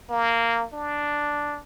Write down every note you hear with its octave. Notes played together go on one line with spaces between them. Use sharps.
A#3
D4